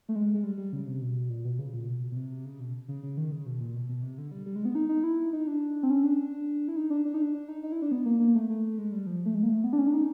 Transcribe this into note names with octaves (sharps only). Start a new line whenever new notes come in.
A3
G#3
G#3
G3
G3
C#3
C3
B2
A#2
B2
C#3
A#2
B2
B2
C3
C#3
B2
C#3
C#3
D#3
C#3
B2
A#2
B2
B2
C3
D3
G3
G3
G#3
B3
D#4
D#4
E4
D#4
D4
C4
C#4
D4
E4
D#4
D4
D4
D#4
D4
D4
D#4
D#4
E4
D4
B3
A#3
A#3
A3
A3
G#3
G3
F3
A3
G#3
A#3
A3
B3
D4
C#4
D4
D#4